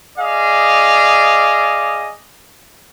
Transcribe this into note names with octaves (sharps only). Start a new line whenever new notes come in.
G#4 D5 D#5 F5